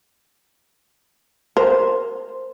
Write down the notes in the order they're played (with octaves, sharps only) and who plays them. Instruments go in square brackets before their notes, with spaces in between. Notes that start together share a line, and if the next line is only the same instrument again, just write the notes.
[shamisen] A#4 [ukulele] C5